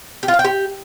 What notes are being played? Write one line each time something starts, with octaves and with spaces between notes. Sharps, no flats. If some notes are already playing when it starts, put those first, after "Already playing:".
G4
F4
F5
G5
G4